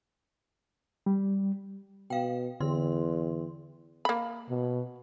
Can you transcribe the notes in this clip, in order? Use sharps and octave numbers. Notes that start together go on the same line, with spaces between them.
G3
B2 F5 G5
E2 D3 C6
A#3 B5
B2